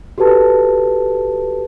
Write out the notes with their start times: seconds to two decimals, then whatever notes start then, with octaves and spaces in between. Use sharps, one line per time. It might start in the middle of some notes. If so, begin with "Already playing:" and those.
0.18 F#4 G4 A4 B4 A5